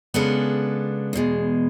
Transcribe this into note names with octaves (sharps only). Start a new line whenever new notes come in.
C#3 G#3 B3 D4 A4
E2 B2 G#3